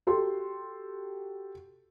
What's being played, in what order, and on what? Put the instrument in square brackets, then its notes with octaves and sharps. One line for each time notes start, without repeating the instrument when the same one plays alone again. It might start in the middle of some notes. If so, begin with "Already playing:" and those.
[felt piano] F#4 G4 A4 C6